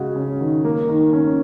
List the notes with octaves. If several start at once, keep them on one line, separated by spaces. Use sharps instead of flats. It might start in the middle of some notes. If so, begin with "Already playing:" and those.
Already playing: C#3 G#3 F#4
C#4
D#3
A#3
D#3
C#4